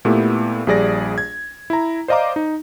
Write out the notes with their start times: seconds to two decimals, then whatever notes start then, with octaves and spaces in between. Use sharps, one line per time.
0.05 A#2 A3 B3 E4 G4
0.67 A#1 G3 G#4 D5 A#6
1.18 G#6
1.70 E4 A#5
2.08 C5 D5 D#5 F5 A#5 D6
2.36 D#4